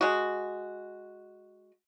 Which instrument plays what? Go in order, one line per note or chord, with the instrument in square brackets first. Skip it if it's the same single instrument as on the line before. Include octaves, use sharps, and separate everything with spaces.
[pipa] G#3 F#4